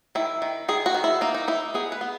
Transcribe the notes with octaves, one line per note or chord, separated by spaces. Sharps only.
D#3 E4
D#3
D#3 G#4
F#4
D#3
E4
A#3 D#4
D#4
D#4 E4
B3 G#4
B4
B3